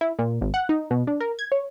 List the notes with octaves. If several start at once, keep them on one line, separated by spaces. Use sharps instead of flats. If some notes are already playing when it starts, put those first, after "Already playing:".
E4
A#2
G#1
F#5
D#4
B2
D4
A#4
G#6
C#5